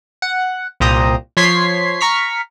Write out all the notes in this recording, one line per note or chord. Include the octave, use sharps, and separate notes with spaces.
F#5
C2 A#2 G4 C5 A#5 D#6
F3 C#5 C6 G#6 B6 C7
A#5 C#6 F6 B6